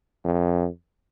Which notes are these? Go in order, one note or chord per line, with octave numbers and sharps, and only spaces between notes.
F2